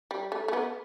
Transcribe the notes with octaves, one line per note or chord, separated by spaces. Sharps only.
G3
A3
A3
B3